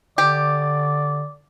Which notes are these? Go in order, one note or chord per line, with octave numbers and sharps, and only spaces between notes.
D3 G4 D5